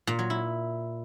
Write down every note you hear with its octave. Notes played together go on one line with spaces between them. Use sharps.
A#2
F#3
E4